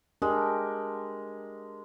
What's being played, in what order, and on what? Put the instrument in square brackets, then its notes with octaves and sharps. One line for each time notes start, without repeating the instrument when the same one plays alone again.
[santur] G#3 [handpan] D4 G4 A#4